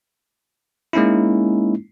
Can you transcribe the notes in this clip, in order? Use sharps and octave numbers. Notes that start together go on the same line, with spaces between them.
G#3 A#3 C#4 D#4 E4